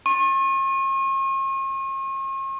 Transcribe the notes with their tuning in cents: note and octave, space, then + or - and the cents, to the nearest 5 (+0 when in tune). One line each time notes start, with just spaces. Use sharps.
C#6 -45